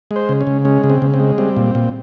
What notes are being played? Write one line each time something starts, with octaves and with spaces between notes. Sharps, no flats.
G#3
C5
C#3
C#4
C#3
G#3 C#4
C#3
C4
C#3
C4
G#3
G3 C4
A#2
A#2